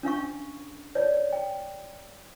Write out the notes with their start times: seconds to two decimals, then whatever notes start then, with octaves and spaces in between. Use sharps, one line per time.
0.03 C#4 D4 F5 C#6
0.95 C#5 D5
1.33 G5